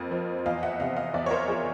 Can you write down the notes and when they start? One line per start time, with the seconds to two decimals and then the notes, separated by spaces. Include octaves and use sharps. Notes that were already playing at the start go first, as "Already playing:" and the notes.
Already playing: F2 A#3 D#5
0.11 F3
0.46 E2 D#5 F5
0.63 E5 F#5
0.80 C3 D#5 F5
0.97 D#5 F5
1.14 E2 D5 E5
1.26 C#5
1.31 A#4 C5
1.47 F3 G#4